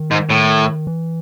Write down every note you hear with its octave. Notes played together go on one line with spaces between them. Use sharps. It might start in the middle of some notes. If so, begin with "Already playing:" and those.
Already playing: D#3
G#2
A2
E3